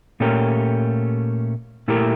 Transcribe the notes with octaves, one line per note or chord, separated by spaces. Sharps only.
A#2 A3 C#4 G4 A#4
A#2 A3 E4 G4 A#4